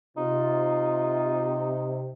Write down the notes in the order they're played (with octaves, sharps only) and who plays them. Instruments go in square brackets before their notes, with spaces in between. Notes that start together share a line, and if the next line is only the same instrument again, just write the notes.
[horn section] C3 [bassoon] D#4 [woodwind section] F4